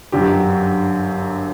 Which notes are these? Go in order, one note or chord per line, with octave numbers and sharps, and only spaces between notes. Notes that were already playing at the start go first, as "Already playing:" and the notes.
G1 F#2 D3 F#3 G4